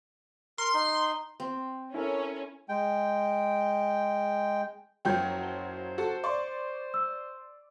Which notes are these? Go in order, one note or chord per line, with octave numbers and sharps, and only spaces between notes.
A#4 C6
D#4
C4
C#4 E4 A4 A#4
G#3 G5
F#1 F3 F#3 G5 G6
C5
F#4 A4
D5 C6 C#6
E6